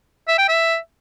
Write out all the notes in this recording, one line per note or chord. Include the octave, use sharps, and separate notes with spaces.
E5
G5
E5